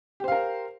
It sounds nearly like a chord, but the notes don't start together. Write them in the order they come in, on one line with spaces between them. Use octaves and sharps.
G4 C5 F5 A#4